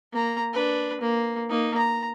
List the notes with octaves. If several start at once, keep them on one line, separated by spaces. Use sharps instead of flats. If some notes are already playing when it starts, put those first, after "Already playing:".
A#3 A#5
D4 B4
A#3
A#3 D#4
A#5